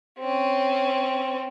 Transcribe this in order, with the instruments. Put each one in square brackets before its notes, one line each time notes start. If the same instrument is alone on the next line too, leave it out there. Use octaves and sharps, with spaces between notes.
[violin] C4 C#4